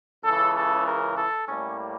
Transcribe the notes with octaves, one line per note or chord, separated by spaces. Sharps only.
C#2 C#3 E3 A4
A4
A#4
A4
A2 G3 A#3 C#4